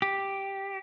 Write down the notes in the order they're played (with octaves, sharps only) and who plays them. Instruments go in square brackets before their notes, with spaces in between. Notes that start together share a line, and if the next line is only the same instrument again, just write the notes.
[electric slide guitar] G4